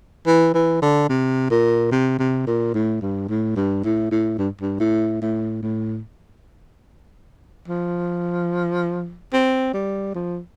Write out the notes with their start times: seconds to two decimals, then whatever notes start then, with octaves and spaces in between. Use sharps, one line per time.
0.27 E3
0.54 E3
0.82 D3
1.09 C3
1.51 A#2
1.91 C3
2.19 C3
2.47 A#2
2.74 A2
3.01 G2
3.29 A2
3.56 G2
3.84 A2
4.11 A2
4.38 G2
4.61 G2
4.80 A2
5.21 A2
5.62 A2
7.68 F3
9.33 C4
9.73 G3
10.14 F3